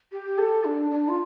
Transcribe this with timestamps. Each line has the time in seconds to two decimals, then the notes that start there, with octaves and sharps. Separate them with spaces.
0.12 G4
0.38 A4
0.64 D4
0.90 D4
1.08 F4